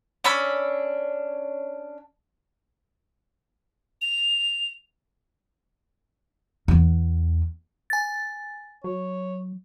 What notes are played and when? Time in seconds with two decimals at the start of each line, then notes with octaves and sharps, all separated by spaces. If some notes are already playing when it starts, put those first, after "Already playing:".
0.24 C#4 D4 B5 E6
4.02 F7
6.68 E2 B3
7.90 G#5 A6
8.84 F#3 C#5